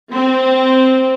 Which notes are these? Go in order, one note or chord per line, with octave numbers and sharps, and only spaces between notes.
C4